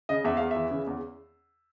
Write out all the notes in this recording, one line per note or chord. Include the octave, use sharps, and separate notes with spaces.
C#3 D#5
E2 E5
E2 F5
E5
E3
C#3
E2